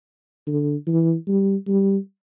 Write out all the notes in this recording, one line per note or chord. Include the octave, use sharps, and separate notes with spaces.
D3
E3
G3
G3